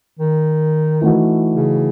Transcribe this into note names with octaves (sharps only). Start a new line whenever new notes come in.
D#3
E3 A3 D#4 F#4
C#3